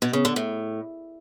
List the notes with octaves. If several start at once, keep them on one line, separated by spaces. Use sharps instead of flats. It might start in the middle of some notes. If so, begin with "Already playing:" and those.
B2
C#3
D3
A2